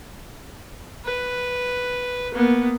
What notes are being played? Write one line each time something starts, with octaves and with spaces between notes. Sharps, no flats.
B4
A#3 B3